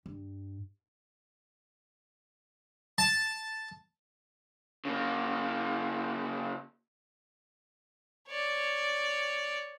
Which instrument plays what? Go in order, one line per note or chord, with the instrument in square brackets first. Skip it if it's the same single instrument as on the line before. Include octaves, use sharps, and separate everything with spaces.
[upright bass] G2
[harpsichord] A5
[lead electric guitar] C#3 A#3
[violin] C#5 D5